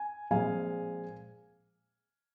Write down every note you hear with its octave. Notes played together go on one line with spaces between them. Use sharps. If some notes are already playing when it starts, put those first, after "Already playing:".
Already playing: G#5
A#2 F3 G#3 C4 F5 G#5